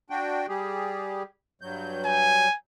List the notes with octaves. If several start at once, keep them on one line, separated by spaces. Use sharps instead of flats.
D4 F#4 G5
G3 G4 G#4
G2 F#3 G6
G#5